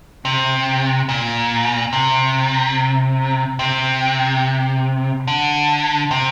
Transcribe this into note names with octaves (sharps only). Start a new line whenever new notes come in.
C3
A#2
C3
C3
D3
C3